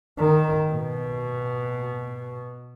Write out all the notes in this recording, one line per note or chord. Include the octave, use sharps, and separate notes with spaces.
D#3
B2